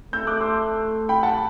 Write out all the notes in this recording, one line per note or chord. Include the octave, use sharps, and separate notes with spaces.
A3 E6 G6
D6 F#6
C6 E6
G5 B5
F#5 A5